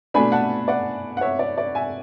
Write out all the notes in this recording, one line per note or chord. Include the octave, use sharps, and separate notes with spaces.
B2 A3 D4 G#5 B5
F#5 A5
D5 F#5
F#5
C#5 E5
D5
D5
E5 G#5